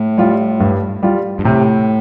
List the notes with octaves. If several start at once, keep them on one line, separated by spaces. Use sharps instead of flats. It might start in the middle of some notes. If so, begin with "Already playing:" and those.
Already playing: A2
G3 F4
G2
G3 F4
G2
A2 C3